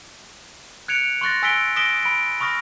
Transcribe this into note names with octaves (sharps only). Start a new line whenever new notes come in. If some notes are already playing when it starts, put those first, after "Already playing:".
F#6 G#6 C#7 D7 F7
C6 C#6 F#6 A6 A#6
G#5 E6 A#6 B6 D7 G7
D#6 A#6 B6 D7 E7 G7
B5 D7
B5 C#6 D#6 F6 A#6